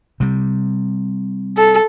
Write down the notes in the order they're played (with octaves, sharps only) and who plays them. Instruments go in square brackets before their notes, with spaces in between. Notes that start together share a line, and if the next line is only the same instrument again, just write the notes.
[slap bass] C3 G3
[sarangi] A4